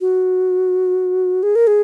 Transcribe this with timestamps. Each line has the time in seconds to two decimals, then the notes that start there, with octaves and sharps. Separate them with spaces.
0.01 F#4
1.43 G#4
1.56 A#4
1.67 G#4